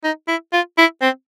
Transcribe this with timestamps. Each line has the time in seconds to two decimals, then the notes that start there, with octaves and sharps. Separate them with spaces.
0.04 D#4
0.28 E4
0.53 F4
0.78 E4
1.02 C4